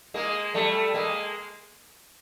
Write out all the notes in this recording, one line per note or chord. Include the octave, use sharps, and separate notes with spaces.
G#3 A#3
G3 A3
G#3 A#3